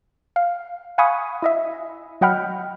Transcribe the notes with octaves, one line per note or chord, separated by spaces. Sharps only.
F5
F5 F#5 G#5 B5 C#6 D#6
E4 D#5 E5
F#3 D#5 F#5 G5 B5 F6